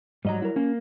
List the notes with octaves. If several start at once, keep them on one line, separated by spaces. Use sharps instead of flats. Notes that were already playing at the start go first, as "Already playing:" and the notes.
G#2 F#3 G3 D#5 A#5
E4 A#4
A#3 C#4